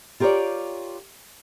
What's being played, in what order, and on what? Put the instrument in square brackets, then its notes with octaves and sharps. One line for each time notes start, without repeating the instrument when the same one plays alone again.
[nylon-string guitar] F4 G4 A#4 B4 C#5 D5